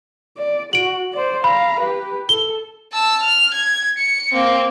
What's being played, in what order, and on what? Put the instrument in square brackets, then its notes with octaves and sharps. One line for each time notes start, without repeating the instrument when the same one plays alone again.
[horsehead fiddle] D5
[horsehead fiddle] F#4 [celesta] D7 F#7
[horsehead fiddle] C5 D5
[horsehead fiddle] F5 A#5 [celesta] B5
[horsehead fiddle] G4 B4
[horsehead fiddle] A4 [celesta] G7
[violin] A5 E6
F6
G#6
C#7
A#3 C4